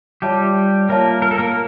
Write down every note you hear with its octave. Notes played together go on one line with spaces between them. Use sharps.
G3 F4 G4 C#5 E5 A5
A#3 F4 A#4 C#5 E5 A5
A#4
A4
A#3 A#4